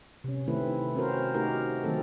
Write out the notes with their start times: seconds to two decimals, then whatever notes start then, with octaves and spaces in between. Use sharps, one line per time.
0.24 C3 C#4
0.48 D#3 A3 C4 E4 B4
0.95 C4 C#4 F#4 A#4 C5
1.34 A3 D#4 F#4 G4 A#4
1.84 D#3 F#3 A3 C4 A4